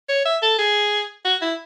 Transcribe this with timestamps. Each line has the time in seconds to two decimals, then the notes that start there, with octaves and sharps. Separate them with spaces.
0.09 C#5
0.25 E5
0.42 A4
0.59 G#4
1.25 F#4
1.42 E4